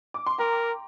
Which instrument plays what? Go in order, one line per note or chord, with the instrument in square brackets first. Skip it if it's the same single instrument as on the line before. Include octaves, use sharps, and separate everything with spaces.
[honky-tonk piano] D6
C6
[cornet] A#4 [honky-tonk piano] G5 A#5